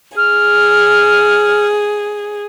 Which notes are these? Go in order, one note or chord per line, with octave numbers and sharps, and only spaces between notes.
G#4 F6